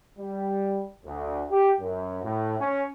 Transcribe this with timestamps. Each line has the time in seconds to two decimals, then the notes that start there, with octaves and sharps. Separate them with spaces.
0.19 G3
1.04 D2
1.51 G4
1.80 F#2
2.23 A2
2.59 C#4